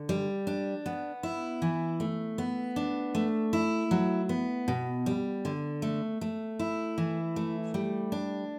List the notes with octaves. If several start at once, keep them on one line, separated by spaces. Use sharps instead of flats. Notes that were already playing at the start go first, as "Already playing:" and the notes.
Already playing: D3
G3
D4
B3
E4
E3
A3
B3
D4
A3
E4
F#3
B3
B2
G3
D3
A3
A3
E4
E3
A3
G3
D4